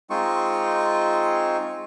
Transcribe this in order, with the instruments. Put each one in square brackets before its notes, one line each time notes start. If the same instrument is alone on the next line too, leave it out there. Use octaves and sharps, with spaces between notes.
[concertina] G#3 C4 D#4 F4 C#6